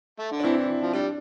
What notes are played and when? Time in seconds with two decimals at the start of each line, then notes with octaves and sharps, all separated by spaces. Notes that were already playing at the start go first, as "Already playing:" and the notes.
0.19 A3
0.32 D3
0.40 D4
0.44 E3 C4 E4
0.57 E3
0.82 F3
0.93 G3 D4